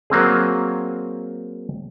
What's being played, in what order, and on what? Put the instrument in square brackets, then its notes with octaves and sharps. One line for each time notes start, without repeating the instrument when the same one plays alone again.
[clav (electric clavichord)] F#3 A#3 C4 G#4